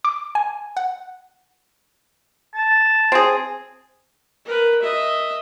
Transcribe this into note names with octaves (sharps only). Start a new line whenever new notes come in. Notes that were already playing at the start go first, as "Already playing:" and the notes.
D6
G#5
F#5
A5
C4 G#4
A#4 B4
D#5 E5